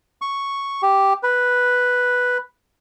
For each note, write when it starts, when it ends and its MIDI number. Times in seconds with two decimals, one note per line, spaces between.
0.22 0.82 85
0.82 1.13 67
1.23 2.38 71